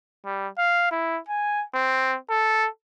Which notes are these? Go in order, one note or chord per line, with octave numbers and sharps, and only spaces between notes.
G3
F5
E4
G#5
C4
A4